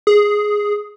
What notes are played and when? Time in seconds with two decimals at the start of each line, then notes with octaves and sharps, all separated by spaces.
0.07 G#4